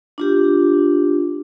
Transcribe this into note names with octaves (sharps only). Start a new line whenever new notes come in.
D4 F4 G4